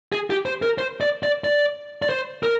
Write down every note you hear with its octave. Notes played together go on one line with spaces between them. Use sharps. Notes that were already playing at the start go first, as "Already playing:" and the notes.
G#4
G4
C5
A#4
C5
D5
D5
D5
D5
C5
A#4